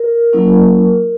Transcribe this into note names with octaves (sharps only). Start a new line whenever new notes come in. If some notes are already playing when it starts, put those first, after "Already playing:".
Already playing: A#4
F#3 A#3 C#4 E4